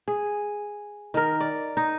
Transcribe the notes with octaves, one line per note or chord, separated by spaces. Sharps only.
G#4
D#3 A#4
D5
D#4